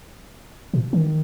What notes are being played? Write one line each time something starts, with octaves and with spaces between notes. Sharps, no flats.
A#2
D#3